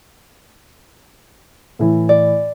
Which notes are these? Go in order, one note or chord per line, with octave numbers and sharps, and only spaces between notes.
A2 E3
D5